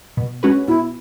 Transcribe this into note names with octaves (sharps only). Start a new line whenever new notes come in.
B2
G#3 C#4 F#4 B4
B2 E4